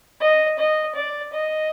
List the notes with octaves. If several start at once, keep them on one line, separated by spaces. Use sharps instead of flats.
D#5
D#5
D5
D#5